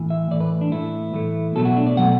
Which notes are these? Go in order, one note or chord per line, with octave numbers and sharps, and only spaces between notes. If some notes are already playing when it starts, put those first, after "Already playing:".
Already playing: A2 E3
E5
A2 E3 A3 D5
B4
D4
A2 E3 A3 E4
A2 E3 A3
B2 F#3 A3 A4
F#4
D4
D5
B2 F#3 A3 F#5